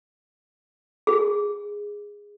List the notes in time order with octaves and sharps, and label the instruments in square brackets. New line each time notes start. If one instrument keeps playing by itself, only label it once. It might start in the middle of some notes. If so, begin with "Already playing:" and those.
[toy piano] G#4